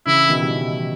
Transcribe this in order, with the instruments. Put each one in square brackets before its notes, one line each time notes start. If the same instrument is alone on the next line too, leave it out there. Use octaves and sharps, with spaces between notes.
[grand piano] C#3 E3 [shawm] E4
[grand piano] B2 D#3
G3
C#3 E3